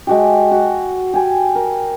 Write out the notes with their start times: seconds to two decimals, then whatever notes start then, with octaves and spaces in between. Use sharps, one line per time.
0.07 G#3 F#4 G4
0.51 F#4
1.14 G4 G#5
1.55 A#4